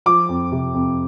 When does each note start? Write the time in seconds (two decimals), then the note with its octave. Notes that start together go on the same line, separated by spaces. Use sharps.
0.06 F3 D6
0.29 F2
0.52 C3
0.74 F2